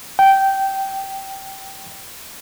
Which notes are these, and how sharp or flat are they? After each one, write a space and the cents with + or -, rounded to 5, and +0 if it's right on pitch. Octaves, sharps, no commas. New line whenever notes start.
G5 -15